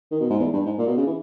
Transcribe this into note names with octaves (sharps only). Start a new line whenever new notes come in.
D#3
B2
G#2
E2
G2
G#2
A#2
B2
C#3
E3